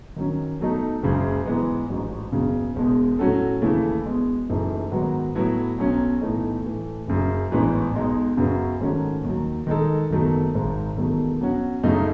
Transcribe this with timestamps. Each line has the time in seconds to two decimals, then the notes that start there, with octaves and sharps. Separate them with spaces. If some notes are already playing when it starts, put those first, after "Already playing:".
0.16 D#3 F#3 C#4
0.60 B2 F#3 A3 D#4
1.03 F#1 F#2 C#3 G#3
1.46 G#2 E3 G#3 B3
1.89 A1 G#2 F#3
2.32 F#1 E2 C#3 F#3
2.76 E1 E2 B2 G#3
3.19 A2 F#3 C#4 F#4 A4
3.62 D#2 C#3 E3 A3 E4
4.05 E1 E2 B2 G#3
4.49 F#1 F#2 E3 A3 D#4
4.91 G#2 D#3 F#3 B3 F#4
5.35 A2 F#3 B3 E4
5.78 B1 B2 F#3 C#4
6.22 B1 A2 E3 A3 D#4
6.64 A2 E3 A3
7.07 F#1 F#2 C#3
7.51 A1 G#2 E3 B3
7.94 B1 B2 G#3 D#4
8.37 F#2 C#3 F#3 B3 F#4
8.81 G#2 D#3 A3 C#4 F#4
9.24 D#2 D#3 F#3
9.67 D#3 G#3 D#4 A4
10.10 F#1 E2 D#3 F#3 A3
10.54 G#1 G#2 D#3
10.97 E1 E2 D#3 F#3 A3
11.41 B2 F#3 C#4 F#4
11.83 F#2 C#3 F#3 A3 D#4